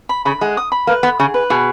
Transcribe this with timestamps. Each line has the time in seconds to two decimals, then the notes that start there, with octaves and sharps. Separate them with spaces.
0.09 B5
0.25 C#3 B5
0.41 G#3 F#5
0.57 D#6
0.72 B5
0.87 A#3 B4
1.03 B3 B5
1.20 C#3 G#4
1.34 B4
1.50 B2 G#4